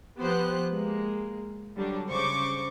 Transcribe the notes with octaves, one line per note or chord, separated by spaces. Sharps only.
F3 B3 G4 C5 F#6
G#3 A#3
D3 F#3 G3 D4
C#3 C5 C#6 D6